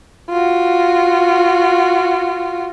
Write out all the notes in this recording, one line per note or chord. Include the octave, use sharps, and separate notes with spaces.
F4 F#4